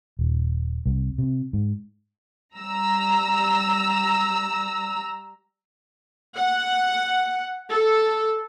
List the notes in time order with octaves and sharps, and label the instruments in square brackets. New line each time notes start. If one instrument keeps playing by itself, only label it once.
[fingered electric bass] D#1
C2
C3
G#2
[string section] G3 A#5 E6
[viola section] F#5
A4